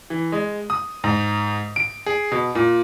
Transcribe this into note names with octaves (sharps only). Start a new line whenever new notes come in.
E3
G#3
D#6
G#2
D7
G#4
B2
A#2